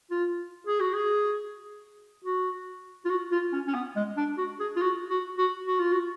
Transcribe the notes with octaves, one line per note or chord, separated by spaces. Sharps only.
F4
G#4
F#4
G#4
F#4
F4
F#4
F4
C#4
C#4
B3
G#3
D4
F#4
G#4
F4
F#4
F#4
F#4
F#4
F4
F#4